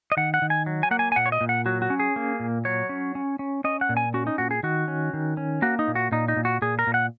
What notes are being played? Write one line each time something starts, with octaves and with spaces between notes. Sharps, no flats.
D#5
D#3 F#5
F#5
D#3
G#5
F#3
G#5
A#3 F#5
G#5
G#5
A#2 F#5
C#5
D#5
A#2
F#5
F#3 F#4
F#4
C#4
G#4
A#3
A#2
F#3 C#5
C#4
C#4
C#4
C#4 D#5
F#5
A#2
G#5
C#4 F#4
D#4
A#2 F#4
G#4
D#3 F#4
C#4
D#3
C#4
A#3 F#4
D#4
A#2
F#4
A#2 D#4
D#4
A#2
F#4
A#2 G#4
A#4
A#2
F#5